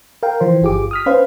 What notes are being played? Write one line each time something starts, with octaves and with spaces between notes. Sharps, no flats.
A#4 F5 G5
E3 F3 C5
G1 F4 G4 G#4 D6
D#6 F6 B6
C#4 B4 C5 F5